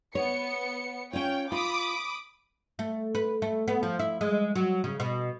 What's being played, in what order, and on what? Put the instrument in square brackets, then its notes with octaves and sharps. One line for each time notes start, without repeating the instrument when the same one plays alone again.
[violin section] B3 C#7 [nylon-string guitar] C#5
[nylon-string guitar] C#4 F4 [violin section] C#5 G5
[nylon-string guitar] F4 [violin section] B5 D6 D#6
[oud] A3
B4
A3
B3
F3
E4
G#3
F#3
C#3
B2